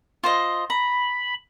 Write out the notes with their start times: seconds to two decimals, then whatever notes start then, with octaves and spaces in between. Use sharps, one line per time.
0.23 F4 C5 D#5
0.70 A#5 B5